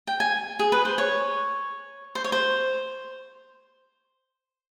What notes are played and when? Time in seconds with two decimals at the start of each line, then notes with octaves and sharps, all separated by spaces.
0.07 G5
0.20 G#5
0.59 G#4
0.72 B4
0.85 C5
0.98 C#5
2.15 C5
2.24 C#5
2.32 C5